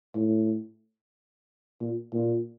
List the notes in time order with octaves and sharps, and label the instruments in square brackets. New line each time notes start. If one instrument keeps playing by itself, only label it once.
[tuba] A2
A#2
A#2